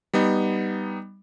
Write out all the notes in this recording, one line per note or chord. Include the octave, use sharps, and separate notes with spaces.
G3 B3 D#4